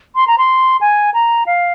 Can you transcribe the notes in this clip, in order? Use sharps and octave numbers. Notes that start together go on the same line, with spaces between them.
C6
A#5
C6
G#5
A#5
F5